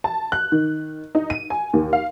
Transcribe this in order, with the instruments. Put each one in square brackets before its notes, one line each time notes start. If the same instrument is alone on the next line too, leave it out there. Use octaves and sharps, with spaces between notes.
[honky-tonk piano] A5
F#6
D#3
D#4
D#7
G#5
D#2
F5